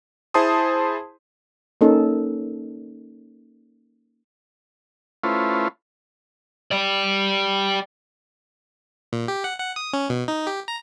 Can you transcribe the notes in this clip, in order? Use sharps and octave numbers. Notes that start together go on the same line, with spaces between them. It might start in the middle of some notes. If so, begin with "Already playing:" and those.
E4 G#4 C5 A5 C6 D#6
A#3 C#4 D#4 A4
A3 C#4 E4 F4 B4 C5
G4 D5
A#2
G4
F#5
F#5
D#6
C#4
B2
D#4
G4
A#5